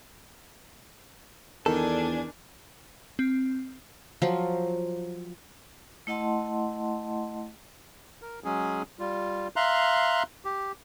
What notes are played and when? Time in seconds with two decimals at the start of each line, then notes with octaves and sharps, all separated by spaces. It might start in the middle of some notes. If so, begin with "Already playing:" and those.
1.66 E2 D#3 D4 A4 G#5
3.19 C4
4.22 F3 F#3 F4
6.07 A3 E4 D#5 F#5 A5 C6
8.22 A#4
8.44 F#3 G#3 C#4 G#4
8.99 G3 F4
9.56 E5 F5 A#5 C6 F#6
10.45 G4